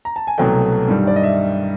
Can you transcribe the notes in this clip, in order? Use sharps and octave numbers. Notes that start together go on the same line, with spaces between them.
A#5
A5
G#5
C2 B2 F#3 A3 G5
G2 D#3 G3
D5
D#5
E5